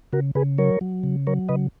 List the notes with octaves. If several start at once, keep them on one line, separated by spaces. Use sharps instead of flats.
C#3 F#4 A#4
C#3 G#4 B4
F#3 A#4 C#5
F#3
C#3
F#3 A#4 C#5
C#3 B4 D#5